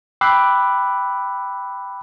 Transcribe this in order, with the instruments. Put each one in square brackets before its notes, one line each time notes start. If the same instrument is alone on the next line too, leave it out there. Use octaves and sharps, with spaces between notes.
[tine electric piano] G5 B5 D6 E6 F#6 C7